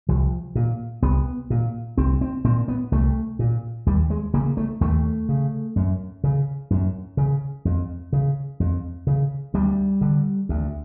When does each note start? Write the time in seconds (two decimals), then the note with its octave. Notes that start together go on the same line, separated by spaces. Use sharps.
0.09 C2 F3
0.55 A#2
1.02 C2 B3
1.50 A#2
1.98 C2 C4
2.21 C4
2.44 A#2 C4
2.68 B3
2.92 C2 A3
3.39 A#2
3.87 D#2 G3
4.10 G#3
4.34 C#3 A#3
4.57 A3
4.81 D#2 A3
5.29 C#3
5.76 F#2
6.24 C#3
6.71 F#2
7.17 C#3
7.65 F2
8.13 C#3
8.60 F2
9.07 C#3
9.54 D2 G3
10.01 D3
10.49 D2